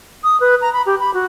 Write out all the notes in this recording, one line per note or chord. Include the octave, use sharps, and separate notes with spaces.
D#6
B4
A#5
B5
G4
B5
F#4